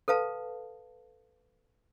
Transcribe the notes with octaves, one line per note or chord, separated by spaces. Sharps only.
A4 B4 F5 A5